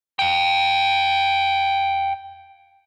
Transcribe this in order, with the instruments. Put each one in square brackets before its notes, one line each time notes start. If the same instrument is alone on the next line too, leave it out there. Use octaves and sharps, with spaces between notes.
[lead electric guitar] F5 G5